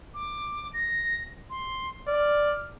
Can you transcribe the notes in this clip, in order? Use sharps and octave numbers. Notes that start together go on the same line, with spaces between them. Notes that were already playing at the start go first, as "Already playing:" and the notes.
D6
A#6
C6
D5 F6